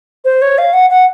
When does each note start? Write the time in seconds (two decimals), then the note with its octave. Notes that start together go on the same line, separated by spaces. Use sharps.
0.25 C5
0.42 C#5
0.58 F5
0.73 F#5
0.90 F#5